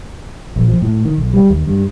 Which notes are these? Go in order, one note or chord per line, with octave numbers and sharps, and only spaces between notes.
A#1
F3
A2
D#3
B1
G3
D#2
G2